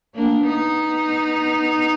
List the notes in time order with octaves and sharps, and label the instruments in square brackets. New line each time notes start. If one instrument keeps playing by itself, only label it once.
[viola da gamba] A#3 D4
B3 D#4